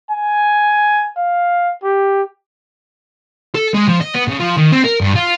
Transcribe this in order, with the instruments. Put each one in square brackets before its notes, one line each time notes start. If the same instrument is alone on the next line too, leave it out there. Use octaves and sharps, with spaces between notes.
[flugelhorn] G#5
F5
G4
[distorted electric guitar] A4
G#3
F3
D#5
B3
C#3
F3
D#3
C4
A#4
G2
F4